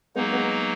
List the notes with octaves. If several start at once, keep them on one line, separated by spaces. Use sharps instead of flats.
F#3 G#3 A#3 B3 D#4
G#3 B3